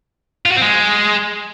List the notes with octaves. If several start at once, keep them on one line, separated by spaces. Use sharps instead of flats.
F4
F#4
C4
G#3